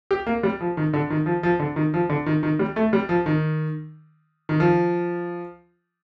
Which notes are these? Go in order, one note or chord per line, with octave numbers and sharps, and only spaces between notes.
G4
A#3
G3
F3
D#3
D3
D#3
F3
F3
D3
D#3
F3
D3
D#3
D#3
G3
A3
G3
F3
D#3
D#3
F3